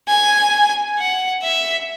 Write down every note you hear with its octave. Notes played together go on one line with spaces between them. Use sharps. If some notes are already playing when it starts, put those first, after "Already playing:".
G#5
F#5
E5